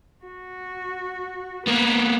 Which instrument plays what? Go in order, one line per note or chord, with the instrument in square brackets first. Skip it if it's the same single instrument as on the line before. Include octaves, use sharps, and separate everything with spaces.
[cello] F#4
[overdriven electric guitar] A#3 B3 [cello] B4